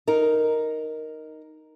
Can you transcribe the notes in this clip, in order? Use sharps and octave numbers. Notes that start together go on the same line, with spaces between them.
D#4 A#4